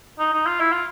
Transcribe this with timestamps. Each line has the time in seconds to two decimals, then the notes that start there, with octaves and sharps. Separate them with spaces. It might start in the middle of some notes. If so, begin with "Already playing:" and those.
0.19 D#4
0.33 D#4
0.46 F4
0.60 E4
0.72 F4